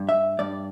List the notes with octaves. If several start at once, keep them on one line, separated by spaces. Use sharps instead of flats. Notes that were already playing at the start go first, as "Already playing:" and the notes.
Already playing: G2
E5
G2 D5